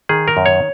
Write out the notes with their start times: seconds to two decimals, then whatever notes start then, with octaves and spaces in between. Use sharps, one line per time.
0.09 D#3 G#4
0.28 A#4
0.37 F#2
0.46 C#5